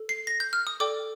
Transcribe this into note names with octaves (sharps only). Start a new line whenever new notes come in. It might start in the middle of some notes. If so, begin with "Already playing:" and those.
Already playing: A4
C7
A#6
G6
F6
D#6
A4 D5 G5 D6